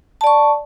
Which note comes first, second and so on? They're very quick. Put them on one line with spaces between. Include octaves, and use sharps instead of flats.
A5 D5 C#6